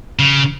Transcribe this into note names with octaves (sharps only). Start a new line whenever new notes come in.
C#3